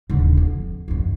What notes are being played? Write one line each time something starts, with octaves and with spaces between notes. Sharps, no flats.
D#1 D3
F2
A1 F#2